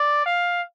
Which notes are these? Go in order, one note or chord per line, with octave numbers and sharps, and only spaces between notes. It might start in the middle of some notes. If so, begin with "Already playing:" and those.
Already playing: D5
F5